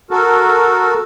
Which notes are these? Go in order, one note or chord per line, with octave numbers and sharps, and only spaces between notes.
F#4 A4 A#4